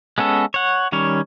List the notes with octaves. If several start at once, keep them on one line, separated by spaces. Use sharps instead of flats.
G#3 B3 C#4 A4
C#5 F#5
D#3 G3 C#4 C#5